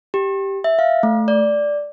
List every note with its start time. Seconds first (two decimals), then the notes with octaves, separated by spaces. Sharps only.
0.14 G4
0.64 E5
0.79 F5
1.03 A3
1.28 D5